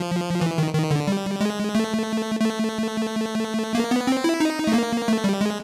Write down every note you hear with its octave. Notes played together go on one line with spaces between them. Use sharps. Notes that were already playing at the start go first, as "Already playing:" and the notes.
Already playing: F3
E3
D#3
D#3
D3
G3
G#3
A3
A3
A#3
B3
C4
E4
D#4
A3
A#3
A3
G3
G#3